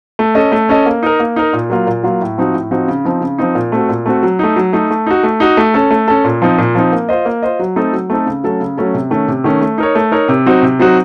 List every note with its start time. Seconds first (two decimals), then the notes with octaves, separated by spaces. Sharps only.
0.19 A3
0.35 C#4 A4 D#5
0.52 A3
0.69 C#4 A4 D#5
0.86 A#3
1.03 D#4 A#4
1.20 A#3
1.36 D#4 A#4
1.53 A#2
1.70 F#3 A#3 F4
1.87 A#2
2.03 F#3 A#3 F4
2.21 A2
2.38 F3 C4 D#4 F#4
2.54 A2
2.71 F3 C4 D#4 F#4
2.88 C#3
3.04 F3 C4 D#4
3.21 C#3
3.38 F3 C4 D#4
3.55 A#2
3.72 A3 C4 F#4
3.89 A#2
4.06 A3 C4 F#4
4.23 F#3
4.39 A3 D#4
4.56 F#3
4.73 A3 D#4
4.90 A3
5.06 D#4 F#4
5.23 A3
5.40 D#4 F#4
5.57 A3
5.74 C#4 A4
5.91 A3
6.08 C#4 A4
6.24 A#2
6.42 F3 C4 D#4
6.58 A#2
6.75 F3 C4 D#4
6.92 A#3
7.09 F4 C5 D#5
7.25 A#3
7.43 F4 C5 D#5
7.59 F#3
7.76 A3 C4 D#4 A4
7.93 F#3
8.10 A3 C4 D#4 A4
8.27 C#3
8.44 F#3 A3 C#4 A4
8.60 C#3
8.77 F#3 A3 C#4 A4
8.94 C3
9.11 D#3 A3 C#4
9.28 C3
9.44 D#3 A3 C#4
9.61 A3
9.78 D#4 A#4 C#5
9.95 A3
10.12 D#4 A#4 C#5
10.28 C3
10.46 F#3 C4 D#4 F#4
10.62 C3
10.79 F#3 C4 D#4 F#4